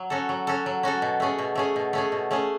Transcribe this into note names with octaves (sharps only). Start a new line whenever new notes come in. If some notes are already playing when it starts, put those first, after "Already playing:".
Already playing: F#3
C#4 F#4 A4
F#3
C#4 F#4 A4
F#3
C#4 F#4 A4
B2
A3 C#4 G#4
B2
A3 C#4 G#4
B2
A3 C#4 G#4
B2
A3 C#4 G#4